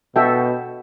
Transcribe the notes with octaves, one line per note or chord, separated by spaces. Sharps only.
B2 F#4 A4 E5 G5